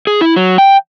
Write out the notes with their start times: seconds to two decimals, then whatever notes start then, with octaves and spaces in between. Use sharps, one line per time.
0.07 G#4
0.21 E4
0.36 F#3
0.58 G5